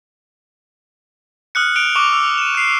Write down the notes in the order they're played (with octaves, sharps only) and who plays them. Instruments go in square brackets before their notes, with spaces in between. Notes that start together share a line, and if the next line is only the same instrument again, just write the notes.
[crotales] D#6 F6 F#6 C#7
D#6 F#6 D7 F7 G7
C#6 D6 F7 G7
E6
D#7 E7
F#6 C7